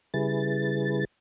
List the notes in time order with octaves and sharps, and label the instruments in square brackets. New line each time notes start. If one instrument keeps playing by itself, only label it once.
[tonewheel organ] C#3 G3 E4 G#4 B4 A6